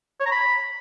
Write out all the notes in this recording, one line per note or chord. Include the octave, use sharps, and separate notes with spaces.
C#5
A#5
B5